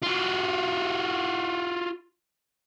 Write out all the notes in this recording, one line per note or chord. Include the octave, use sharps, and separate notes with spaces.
F4 F#4